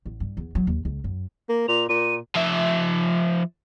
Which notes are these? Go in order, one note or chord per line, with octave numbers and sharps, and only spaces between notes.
A1
G2
E2
F#3
D#2
C#2
F#2
A#3
A#2 F7
A#2 D#7
F3 E5